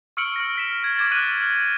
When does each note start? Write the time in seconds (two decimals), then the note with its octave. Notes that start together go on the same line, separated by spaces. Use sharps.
0.17 C#6 E6 F6 C#7 D7 F#7
0.36 F6 A#6
0.56 F6 B6 E7
0.83 F6 G#6
0.96 D6 G#6 A6 B6
1.11 D6 F6 F#6 B6 D#7 F#7